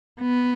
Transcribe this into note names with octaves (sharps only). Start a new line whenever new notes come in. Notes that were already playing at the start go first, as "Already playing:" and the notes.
B3